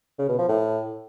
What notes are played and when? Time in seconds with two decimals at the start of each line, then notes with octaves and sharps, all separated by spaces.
0.19 C#3
0.29 B2
0.39 F3
0.49 A2